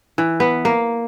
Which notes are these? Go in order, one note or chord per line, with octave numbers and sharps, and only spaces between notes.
E3
B3
A#3